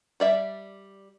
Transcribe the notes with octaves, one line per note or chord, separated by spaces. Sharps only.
G3 D5 E5